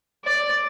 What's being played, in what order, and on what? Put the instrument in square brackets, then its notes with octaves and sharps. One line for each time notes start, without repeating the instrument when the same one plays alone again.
[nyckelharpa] D5